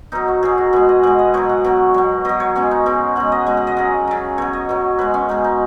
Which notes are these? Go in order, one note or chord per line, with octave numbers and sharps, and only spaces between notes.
B2 F#3 D#4
F#4
B2 F#3 G#4
F#4
B2 G#3 B4
D#5
B2 G#3 F#5
D#5
B2 F#3 C#5
F#5
B2 F#3
B2 F#3
B2 F#3 D#5
C#5
B2 G#3 C#4
D#4
B2 G#3
B2 G#3 F#5
D#5
B2 G#3 D#5
F#5
D#5
C#3 F#3
C#3 F#3
B2 F#3 C#5
D#5
B2 F#3
B2 G#3 B4
C#4
B2 G#3 D#4
D#4